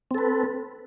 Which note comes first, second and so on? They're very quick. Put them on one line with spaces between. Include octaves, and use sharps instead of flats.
C4 A4 B4